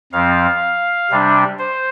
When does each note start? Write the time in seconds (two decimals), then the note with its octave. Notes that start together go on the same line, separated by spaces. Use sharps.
0.13 F2 F3 C4 F5
1.11 C3 G3 D4
1.59 C5